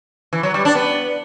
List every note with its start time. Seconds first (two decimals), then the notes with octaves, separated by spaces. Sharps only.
0.33 E3
0.43 F#3
0.54 G3
0.65 D4
0.75 B3